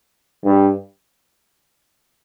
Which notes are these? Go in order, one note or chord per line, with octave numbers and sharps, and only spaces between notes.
G2